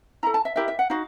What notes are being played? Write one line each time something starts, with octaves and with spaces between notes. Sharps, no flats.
E4 A4 A#5
A5
E5
E4 G4 A#4 E5
E5
F#5
D#4 F#4 F5